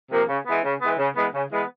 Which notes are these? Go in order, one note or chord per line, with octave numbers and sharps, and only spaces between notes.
C3 F3 A#3
C#3
E3 G#3 B3
C#3
E3 G#3 B3
C#3
E3 G#3 B3
C#3
E3 G#3 B3